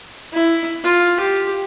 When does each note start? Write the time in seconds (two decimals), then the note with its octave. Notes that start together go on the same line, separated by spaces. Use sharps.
0.33 E4
0.83 F4
1.20 G4